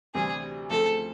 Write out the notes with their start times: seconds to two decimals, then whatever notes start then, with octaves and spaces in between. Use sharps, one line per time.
0.14 D2 C3 E3 G3 C4 G#4
0.70 D2 C#3 F3 A3 C4 A4